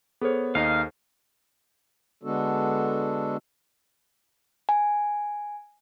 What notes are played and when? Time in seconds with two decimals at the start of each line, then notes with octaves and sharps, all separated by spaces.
0.21 B3 G#4 A4 C5 C#5
0.55 D#2 D#4 D#5 F5
2.23 D3 G#3 B3 D4 F#4 A4
4.69 G#5